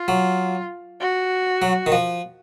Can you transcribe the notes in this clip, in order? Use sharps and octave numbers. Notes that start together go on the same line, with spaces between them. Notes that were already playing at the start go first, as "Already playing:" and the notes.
Already playing: F4
F#3
F#4
F#3
D#3
F3